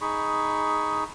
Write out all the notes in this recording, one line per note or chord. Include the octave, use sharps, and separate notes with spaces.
D#4 G#4 B5 C#6